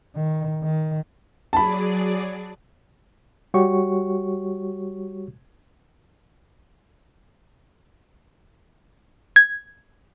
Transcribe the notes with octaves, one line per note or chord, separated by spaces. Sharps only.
D#3
D#3
F#3 G#4 D5 A5 B5
G3 F#4 G4 C#5 C#6
G#6